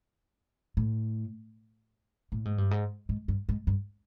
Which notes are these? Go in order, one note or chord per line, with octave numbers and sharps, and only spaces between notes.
A2
A2
G#2
G2
G#2
G#2
G2
G#2
G2